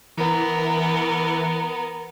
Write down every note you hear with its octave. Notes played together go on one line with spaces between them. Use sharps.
E3 B3 A#4